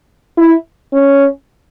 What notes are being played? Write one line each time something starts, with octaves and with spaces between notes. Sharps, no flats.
E4
C#4